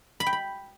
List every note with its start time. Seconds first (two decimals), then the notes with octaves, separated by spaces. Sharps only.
0.20 B5
0.26 G5
0.33 B5